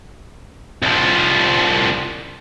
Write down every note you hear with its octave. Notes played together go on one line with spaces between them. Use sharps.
C2 F3